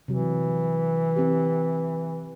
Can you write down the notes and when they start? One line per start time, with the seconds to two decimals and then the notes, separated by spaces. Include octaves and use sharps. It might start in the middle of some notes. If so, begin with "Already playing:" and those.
0.08 C3 E3 F#3
1.16 C4 G4